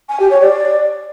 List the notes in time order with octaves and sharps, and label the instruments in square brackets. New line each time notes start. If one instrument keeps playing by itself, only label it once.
[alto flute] G#5
G4
C#5
D5